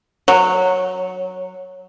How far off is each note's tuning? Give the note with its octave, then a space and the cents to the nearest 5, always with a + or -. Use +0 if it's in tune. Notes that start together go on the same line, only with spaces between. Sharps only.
F#3 -10